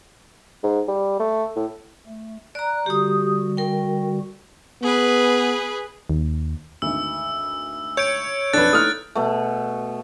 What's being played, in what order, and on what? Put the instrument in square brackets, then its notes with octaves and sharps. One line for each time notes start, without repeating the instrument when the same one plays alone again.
[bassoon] G#2
G3
A3
A2
[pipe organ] A3
[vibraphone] D5 A#5 [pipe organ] F#6
[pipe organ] D3 G3 F#4 [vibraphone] G4 D#6
[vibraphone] A#4 G5
[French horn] B3 [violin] G#4 B4
[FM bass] D#2
[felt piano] G#1 D2 [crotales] E6
[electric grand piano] C#5 [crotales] G6 D7
[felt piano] B1 F2 [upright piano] D4 B4 [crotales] F#6 A6
[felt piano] A3 D#4 E4 [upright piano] D#6 F6
[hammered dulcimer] B2 A3